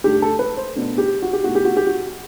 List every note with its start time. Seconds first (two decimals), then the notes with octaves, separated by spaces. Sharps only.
0.04 G2 D3 A3 G4
0.22 A4
0.39 B4
0.57 C5
0.75 B2 A3 D4
0.98 G4
1.22 F#4
1.33 G4
1.44 B2 A3 E4 F#4
1.55 G4
1.65 F#4
1.77 G4
1.87 F#4